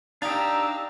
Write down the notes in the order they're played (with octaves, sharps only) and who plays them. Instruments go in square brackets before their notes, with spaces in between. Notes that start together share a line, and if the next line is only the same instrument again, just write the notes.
[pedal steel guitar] D4 G4 [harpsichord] D#4 [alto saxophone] F5 [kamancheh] A#5 E6